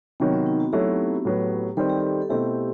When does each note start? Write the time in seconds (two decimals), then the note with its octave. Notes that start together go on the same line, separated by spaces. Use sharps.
0.20 C3 D#3 F#3 B3
0.33 C4
0.46 D#4
0.60 F#4
0.73 F#3 A3 E4 G4
1.25 A2 F#3 B3
1.77 D#3 G3 C4 A4
1.89 G4
2.00 A4
2.22 A4
2.29 B2 A3 C4 E4 G4